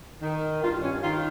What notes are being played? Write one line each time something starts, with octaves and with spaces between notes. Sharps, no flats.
D#3
G2 F4
C#4
D#3 F4